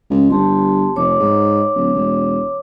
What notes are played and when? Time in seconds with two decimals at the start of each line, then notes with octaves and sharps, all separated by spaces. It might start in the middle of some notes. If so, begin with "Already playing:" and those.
0.10 C#2
0.30 G1 G4 A5 C6
0.96 F1 C#5 D6
1.20 G#2
1.76 D1
1.94 E1